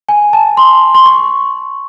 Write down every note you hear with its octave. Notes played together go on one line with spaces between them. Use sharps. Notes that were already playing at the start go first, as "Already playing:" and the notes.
G#5
A5
C6
C6
C#6